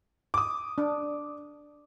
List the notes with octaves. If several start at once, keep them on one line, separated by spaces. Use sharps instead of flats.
D6 D#6
D4